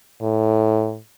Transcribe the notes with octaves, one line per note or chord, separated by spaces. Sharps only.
A2